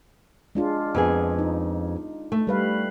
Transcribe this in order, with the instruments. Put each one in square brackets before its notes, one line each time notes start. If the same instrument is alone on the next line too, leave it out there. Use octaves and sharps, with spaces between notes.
[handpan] G#3 D4 F4
[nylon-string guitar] F2 B3 G#4
[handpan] D#4
[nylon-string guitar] A3
[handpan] G3 B4 F5